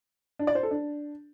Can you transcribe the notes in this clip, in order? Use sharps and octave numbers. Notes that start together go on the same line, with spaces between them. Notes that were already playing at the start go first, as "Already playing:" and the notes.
D4
D5
C5
A4
D4